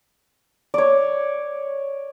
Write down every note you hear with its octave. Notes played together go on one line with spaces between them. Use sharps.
C#5 D5